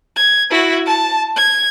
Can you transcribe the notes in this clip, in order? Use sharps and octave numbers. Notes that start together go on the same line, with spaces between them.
G#6
E4 F#4
A5
G#6